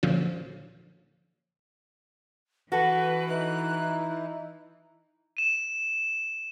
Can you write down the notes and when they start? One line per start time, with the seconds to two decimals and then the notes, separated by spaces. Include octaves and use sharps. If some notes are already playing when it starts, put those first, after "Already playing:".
0.03 A#2 D3 F3 F#3 C#4
2.72 E3 F#4 A4 B4
3.28 D#4 E4 F#6
5.37 D#7 E7